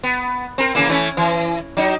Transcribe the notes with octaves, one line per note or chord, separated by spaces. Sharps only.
B3
C4 A#4
C#3 E3 A#3
E3 A3 C#4
E3
F#3 D#4